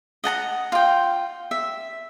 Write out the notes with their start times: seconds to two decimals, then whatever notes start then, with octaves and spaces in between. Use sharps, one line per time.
0.24 D#5 F#5 A5 A#5
0.72 F4 G5
1.51 E5